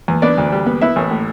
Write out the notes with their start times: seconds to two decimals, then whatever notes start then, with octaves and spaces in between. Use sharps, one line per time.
0.08 E2
0.22 B3 D4 D5
0.38 D2
0.52 G3
0.66 B3
0.81 B3 E4 E5
0.96 A1
1.11 A2